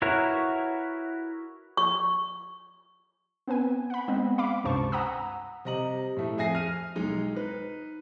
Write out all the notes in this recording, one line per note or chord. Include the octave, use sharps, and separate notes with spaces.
E4 F#4 A#4 B4 C#5
C#6
B3 C4 B4 G#5
F#5 B5
G#3 B3 C4 D#5
F5 B5 D6
C#2 G2 C3 C5 A5 C#6
F#5 G#5 A#5 B5 D#6 E6
C3 G3 D#5 A#5 F#7
A2 A3
F2 G#4 E5 G#5 A#6 C7
F6 D#7
B1 G#3 D#4
D#4 B4